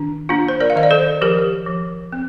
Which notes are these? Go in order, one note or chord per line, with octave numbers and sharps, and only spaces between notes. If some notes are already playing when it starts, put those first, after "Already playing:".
Already playing: D#3 D4
A#3 D4 F4
C5
A#4 D5
F5
D#3 D#5
D5
A4 C5
F3 G4 A#4
F3
C4